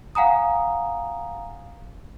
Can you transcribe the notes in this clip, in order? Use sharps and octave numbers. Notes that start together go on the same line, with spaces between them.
F5 F#5 G#5 A#5 D#6